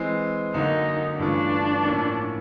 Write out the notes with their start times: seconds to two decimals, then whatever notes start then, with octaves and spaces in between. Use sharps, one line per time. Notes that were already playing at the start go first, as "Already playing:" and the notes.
Already playing: E3 G#3 C4
0.54 F#2 D3 F#3 A#3 D#4
1.19 G2 E3 A3 C#4 D4 F4
1.83 A2 F3 A#3 C#4